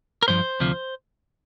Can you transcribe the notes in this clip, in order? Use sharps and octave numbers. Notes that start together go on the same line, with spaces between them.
A#4
G2 F3 C5
D2 C3 F3